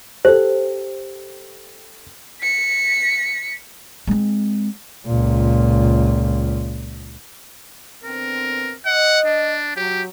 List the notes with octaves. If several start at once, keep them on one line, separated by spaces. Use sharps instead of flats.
G4 A4 C5
B6 C#7
G#3 C4
C#2 A#2
D3 B3 C4 A#4
D#5 F#5
D4
F#3 G4